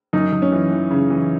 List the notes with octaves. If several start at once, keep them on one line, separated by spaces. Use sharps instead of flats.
F#2 D#4
F#2
C#4
E3
E3
C#3
E3